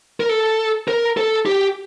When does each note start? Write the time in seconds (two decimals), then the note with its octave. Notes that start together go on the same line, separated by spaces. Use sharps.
0.20 A#4
0.29 A4
0.88 A#4
1.17 A4
1.46 G4